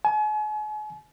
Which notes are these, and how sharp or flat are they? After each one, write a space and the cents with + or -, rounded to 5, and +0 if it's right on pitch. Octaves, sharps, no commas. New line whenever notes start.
G#5 +40